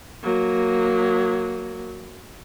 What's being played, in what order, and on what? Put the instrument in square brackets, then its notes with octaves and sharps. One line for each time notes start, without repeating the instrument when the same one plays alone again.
[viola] F#3 A#3